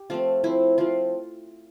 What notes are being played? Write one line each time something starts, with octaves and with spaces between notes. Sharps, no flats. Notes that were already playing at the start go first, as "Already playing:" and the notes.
Already playing: G4
F3 A3 C4 F4
F3 C4 E4
F3 C4 F4